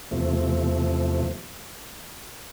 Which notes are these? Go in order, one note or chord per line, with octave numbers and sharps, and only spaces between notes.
E2 C3 F3 A3